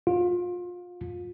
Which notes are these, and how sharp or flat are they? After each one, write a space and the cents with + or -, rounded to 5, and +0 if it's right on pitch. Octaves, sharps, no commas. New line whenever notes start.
F4 +30